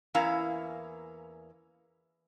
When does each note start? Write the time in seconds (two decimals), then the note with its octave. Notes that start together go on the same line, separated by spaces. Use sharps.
0.14 E2 A#3 C#4 E4 F5 A#5